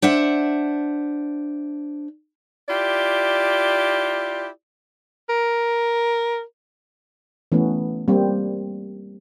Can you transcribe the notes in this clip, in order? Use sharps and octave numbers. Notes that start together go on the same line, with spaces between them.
D4 C5 E5 F#5
E4 F4 G4 D5
A#4
E3 A3 B3 C#4
G3 A#3 C4